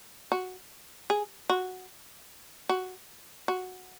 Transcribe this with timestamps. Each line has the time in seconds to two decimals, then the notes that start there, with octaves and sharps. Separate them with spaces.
0.32 F#4
1.10 G#4
1.50 F#4
2.69 F#4
3.48 F#4